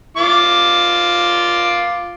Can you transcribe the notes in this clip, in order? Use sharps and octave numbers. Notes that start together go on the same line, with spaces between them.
F4 D6